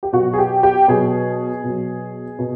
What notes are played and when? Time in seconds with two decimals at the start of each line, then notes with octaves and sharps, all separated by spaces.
0.03 G4
0.13 B2 F#3 F#4
0.33 G#4
0.38 G4
0.63 G4
0.88 B2 F#3 G#4
1.64 B2 F#3
2.39 B2